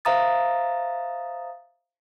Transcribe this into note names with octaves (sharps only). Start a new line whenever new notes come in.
C5 E5 F5 A#5 D#6 A6